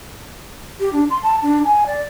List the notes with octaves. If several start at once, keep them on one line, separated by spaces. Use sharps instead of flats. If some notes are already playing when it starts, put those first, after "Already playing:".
G4
D4
C6
A5
D4
G#5
D5